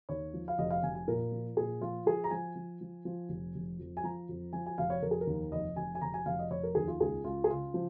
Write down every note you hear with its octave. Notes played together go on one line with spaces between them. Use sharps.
D#2 C#5
F3
F5
F1 D#5
F5
F1 G#5
G#5
A#2 A#4
F3
A#2 G#4
F3 F4
F3 G#4
A#5
F3 G#5
F3
F3
F3
F1
F1
F2
G#5
F3 A#5
F2
F3 G#5
G#5
F1 F5
C#5
F1 A#4
G#4
A#4
D#2
F1 D#5
F1 G#5
G#5
F1 A#5
G#5
F1 F5
D#5
F1 C#5
A#4
D#2 G#4
F4
C#2 G#4
C#2 F4
G#4
C#3 F4
F3